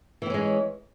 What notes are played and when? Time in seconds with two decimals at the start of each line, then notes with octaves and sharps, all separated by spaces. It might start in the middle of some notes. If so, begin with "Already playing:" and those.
0.22 E3
0.26 C4
0.30 C#4
0.34 G#3